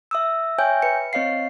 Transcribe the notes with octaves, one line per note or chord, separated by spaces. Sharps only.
E5 D#6 E6
C#5 E5 G5 G#5 F6 G6
B4 C#7
C4 C#5 D#5 F5 C7